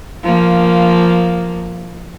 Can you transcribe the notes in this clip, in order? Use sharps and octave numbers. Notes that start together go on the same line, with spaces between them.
F3 A#3